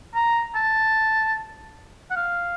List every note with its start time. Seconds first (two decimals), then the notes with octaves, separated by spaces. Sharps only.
0.15 A#5
0.55 A5
2.11 F#5
2.16 F5